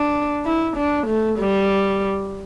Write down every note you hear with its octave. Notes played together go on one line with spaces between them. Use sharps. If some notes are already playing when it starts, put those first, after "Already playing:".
Already playing: D4
E4
D4
A3
G3